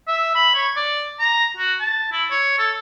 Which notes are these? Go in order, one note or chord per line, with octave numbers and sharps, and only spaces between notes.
E5
B5
C#5
D5
A#5
F#4
A5
E4
C#5
A4